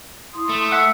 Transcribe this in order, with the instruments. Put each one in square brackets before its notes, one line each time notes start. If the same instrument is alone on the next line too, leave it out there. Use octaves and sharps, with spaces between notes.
[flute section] E4 C6 D#6
[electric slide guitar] A3
[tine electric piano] E5 F#5